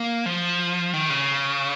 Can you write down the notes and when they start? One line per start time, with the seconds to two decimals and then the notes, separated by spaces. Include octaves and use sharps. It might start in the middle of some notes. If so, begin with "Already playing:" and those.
Already playing: A#3
0.26 F3
0.94 D#3
1.10 C#3